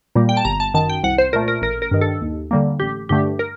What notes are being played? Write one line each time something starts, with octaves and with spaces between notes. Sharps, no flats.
A#2 G3 A#3
G5
A5
G1 A#5
A5
F#2 D#3 A5
G5
C2 F#5
C5
A#2 A3 A#4
A#4
A1 A#4
A#4
G2 D#3
A4
D#2
D3 G3 A#3
A1 G4
G2 D3 A3 G4
A#4